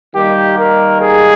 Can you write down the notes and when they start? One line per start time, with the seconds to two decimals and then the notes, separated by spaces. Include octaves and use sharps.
0.14 D#3 G3 A#3 G4
0.58 A#4
1.00 G#4